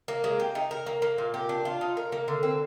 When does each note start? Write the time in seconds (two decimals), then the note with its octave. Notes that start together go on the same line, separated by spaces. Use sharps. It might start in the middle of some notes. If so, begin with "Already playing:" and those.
0.08 A#3
0.24 G#3
0.40 G4
0.55 D#4
0.71 A#4
0.86 A#3
1.02 A#3
1.18 A#2
1.34 G4
1.49 D4
1.65 F4
1.81 D#4
1.97 A#4
2.12 A#3
2.28 D3
2.43 C4